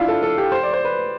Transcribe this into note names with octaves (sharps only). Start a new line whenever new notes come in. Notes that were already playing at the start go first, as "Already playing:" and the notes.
Already playing: D4 E4 F4
A4
A4
G4
C5
D5
C5
B4